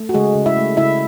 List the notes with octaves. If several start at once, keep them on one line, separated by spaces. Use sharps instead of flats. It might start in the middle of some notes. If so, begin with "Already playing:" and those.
Already playing: A3
F#4
C#3 G#3 G#4
C#3
E4 E5
A3
C#3 E4 E5